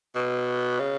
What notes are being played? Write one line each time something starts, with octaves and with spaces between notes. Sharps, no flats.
B2
C#3